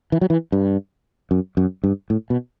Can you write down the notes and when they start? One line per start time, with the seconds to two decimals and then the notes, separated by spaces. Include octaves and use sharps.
0.12 E3
0.21 F#3
0.30 E3
0.52 G2
1.31 F#2
1.57 F#2
1.84 G2
2.10 A2
2.30 B2